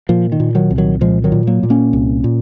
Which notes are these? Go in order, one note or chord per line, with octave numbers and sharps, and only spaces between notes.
A#2 F3
D#3
A#2
D#3 F#3
C2
D#3 F#3
A#2 F3 G#3
D#3 F#3
A#2
F#3 A#3
A#2
A#3 C#4
C2
A#2